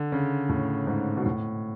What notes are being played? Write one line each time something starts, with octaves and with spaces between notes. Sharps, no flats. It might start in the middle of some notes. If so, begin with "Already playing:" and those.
Already playing: D3
C#3
A2
G#2
B2
A2